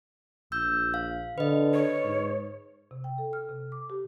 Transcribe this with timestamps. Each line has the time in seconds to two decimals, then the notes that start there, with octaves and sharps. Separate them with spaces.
0.52 A#1 E6 G6
0.94 F5
1.38 D3 B4 D#5
1.73 C#5
2.04 G#2
2.91 C3
3.04 G5
3.18 A4
3.33 F6
3.49 C3
3.72 D6
3.90 G4